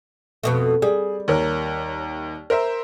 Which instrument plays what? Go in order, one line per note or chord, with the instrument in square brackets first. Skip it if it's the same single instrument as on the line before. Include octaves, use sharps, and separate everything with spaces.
[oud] F2 B2 A3
[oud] G3 [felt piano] G#4
[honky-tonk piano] D#2 A#4 [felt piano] C#5
[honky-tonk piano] A#4 C5 E5